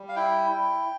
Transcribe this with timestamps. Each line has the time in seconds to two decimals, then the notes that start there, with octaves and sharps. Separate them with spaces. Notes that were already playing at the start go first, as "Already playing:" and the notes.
Already playing: G3
0.09 F5
0.16 E4 G5
0.50 E4